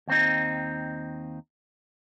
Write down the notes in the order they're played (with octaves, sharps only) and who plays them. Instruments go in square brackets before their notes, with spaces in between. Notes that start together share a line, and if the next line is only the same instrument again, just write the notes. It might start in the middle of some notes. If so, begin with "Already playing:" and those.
[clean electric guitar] D#2 C4 D#4